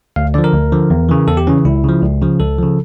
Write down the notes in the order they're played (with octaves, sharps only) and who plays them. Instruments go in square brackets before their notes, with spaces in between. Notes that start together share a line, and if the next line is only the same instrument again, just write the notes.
[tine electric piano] D2 F5
D3 F3 D5
A#4
D2
D3 F3
E2
C#3 E3
E2 A4
G4
C#3 E3 C#4
C#2 E4
C#3 F3
C#2
C#3 F3
C#2 A4
C#3 F3